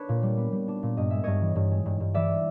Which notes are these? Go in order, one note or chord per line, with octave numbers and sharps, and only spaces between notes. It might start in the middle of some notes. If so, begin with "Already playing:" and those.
Already playing: D4 B4 C#5
A#2
G3
B3
G3
D4
A#2
G2 D#5
G#3 E5
G2 C#5 D#5
E3
G2
G#3
G2
G2
E3 D5 E5